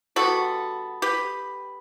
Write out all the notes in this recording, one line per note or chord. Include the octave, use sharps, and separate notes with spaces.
D3 G3 B3 F#4 A4
G4 B4